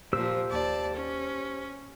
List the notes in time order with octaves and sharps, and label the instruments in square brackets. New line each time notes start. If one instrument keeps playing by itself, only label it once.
[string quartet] A#2 F3 [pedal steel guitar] G4 C5 E6
[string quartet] D#2 D5 A5
C#4